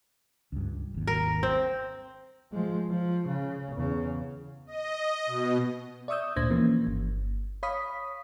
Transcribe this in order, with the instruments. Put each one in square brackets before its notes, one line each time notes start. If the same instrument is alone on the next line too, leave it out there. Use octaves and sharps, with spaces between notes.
[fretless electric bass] C#2 G2
G#1 D#2
[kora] A#4
C4
[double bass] F3 G#3
F3
C#3
E2 C#3
[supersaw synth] D#5
B2
[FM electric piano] D5 E5 C#6 D#6 E6 G6
D2 A#2 D4 C5 G#6 A#6
E3 F3 A#3 C#4
G1
C#5 F5 B5 C#6 D#6 B6